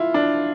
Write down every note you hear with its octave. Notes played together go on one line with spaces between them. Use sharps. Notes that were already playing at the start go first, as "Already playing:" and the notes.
Already playing: E4 F4
D4